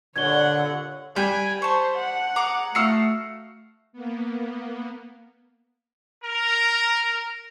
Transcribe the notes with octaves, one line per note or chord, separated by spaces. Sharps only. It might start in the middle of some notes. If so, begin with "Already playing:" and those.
G2 A#2 D3 C#5 F#5 G#6 G7
G3 G5 G#5 F#6
C5 A5 C#6
F#5
G#4 A#5 D6
A3 F#4 F5 D#6 E6 C7 C#7
A#3 B3
A#4